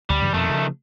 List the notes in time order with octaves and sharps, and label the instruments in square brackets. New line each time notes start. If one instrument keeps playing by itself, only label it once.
[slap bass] D2 [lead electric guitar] G3
[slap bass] G2 C#3 E3
[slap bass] F2 B2 [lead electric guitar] D#3 A3
[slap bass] C#3 E3 F3